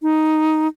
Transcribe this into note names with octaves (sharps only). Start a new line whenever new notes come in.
D#4